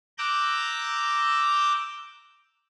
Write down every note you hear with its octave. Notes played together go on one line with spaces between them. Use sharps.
A#5 D6 E6 F#6 G6